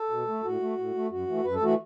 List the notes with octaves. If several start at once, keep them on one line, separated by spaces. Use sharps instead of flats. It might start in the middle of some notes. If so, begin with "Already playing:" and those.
Already playing: A4
B2
A3
A2 F#4
A3
A2
A3
F#2 F#4
E3 A3
F#2 B4
A4
E3 A3 F#4